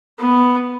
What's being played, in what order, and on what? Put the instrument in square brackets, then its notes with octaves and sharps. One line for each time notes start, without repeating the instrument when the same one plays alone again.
[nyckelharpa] B3